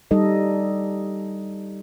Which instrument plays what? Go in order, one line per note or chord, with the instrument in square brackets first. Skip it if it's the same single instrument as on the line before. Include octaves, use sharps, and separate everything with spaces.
[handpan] G3 D#4 A4 D#5